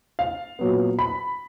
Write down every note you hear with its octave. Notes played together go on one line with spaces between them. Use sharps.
F5
A#2 F#3 B3
B5